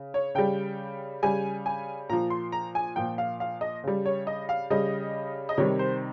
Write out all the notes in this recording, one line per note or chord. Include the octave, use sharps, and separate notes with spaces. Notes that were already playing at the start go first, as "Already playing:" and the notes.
Already playing: C#3
C#5
C#3 G3 G5
C#3 G3 G#5
G#5
A#2 F3 A#5
C6
A#5
G#5
A#2 F3 G5
F5
F5
D#5
C#3 G3
C#5
D#5
F5
C#3 G3 D#5
D#5
C3 D#3 G3 C#5
C5